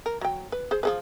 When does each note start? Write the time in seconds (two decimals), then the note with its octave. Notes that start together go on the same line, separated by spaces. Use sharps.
0.06 A#4
0.21 F#3 G5
0.52 B4
0.71 G#4 C5
0.83 F3 G#4 B4